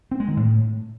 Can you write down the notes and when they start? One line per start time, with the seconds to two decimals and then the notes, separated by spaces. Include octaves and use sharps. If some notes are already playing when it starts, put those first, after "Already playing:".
0.12 C4
0.20 G#3
0.28 D#3
0.37 A2